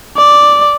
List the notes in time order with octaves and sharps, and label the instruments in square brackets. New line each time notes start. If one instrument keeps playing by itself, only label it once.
[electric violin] D5